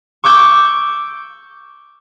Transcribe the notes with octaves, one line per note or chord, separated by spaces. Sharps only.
C#6 D6 E6 G6